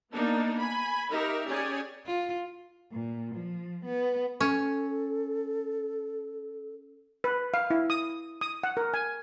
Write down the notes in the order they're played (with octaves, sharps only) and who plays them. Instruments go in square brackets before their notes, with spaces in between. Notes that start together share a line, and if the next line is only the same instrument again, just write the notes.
[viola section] A#3 B3 D4 D#4
G#5 B5
D#4 G4 A#4 E5
C#4 G4 G#4 C#5 D5 G#5
[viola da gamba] F4
[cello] A#2
F3
B3
[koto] C#4 [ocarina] A4
[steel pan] B4
F5
E4
D#6
D#6
F#5
A#4
G#5